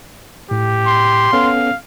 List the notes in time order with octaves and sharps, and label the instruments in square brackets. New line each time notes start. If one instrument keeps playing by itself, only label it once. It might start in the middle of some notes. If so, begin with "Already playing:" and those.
[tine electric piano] A2 [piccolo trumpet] G4
[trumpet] C6
[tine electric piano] B3 C#4 A4 [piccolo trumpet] F5